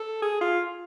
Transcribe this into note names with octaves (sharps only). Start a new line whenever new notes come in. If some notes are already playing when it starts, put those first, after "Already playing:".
Already playing: A4
G#4
F4